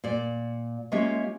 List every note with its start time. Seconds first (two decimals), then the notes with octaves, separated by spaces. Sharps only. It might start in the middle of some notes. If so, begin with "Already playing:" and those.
0.04 A#2 D5
0.92 G#3 A#3 C#4 F4 G4 E5